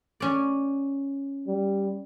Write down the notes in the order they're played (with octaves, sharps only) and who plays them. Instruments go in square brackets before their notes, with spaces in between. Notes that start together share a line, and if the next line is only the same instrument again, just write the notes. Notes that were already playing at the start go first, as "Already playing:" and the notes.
[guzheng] C#4 D5
[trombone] G3